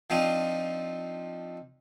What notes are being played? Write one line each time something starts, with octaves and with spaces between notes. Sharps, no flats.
F3 C4 D4 D#4 F4